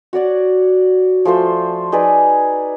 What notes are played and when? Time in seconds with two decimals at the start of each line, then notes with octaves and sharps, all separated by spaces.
0.13 F#4 C#5 D5 F#5
1.25 F3 A3 A4 C5
1.92 D#4 G#4 B4 D5